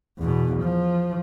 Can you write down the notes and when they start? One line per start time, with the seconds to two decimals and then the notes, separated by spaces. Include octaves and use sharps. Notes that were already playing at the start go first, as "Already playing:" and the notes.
0.18 E2 B2
0.62 F3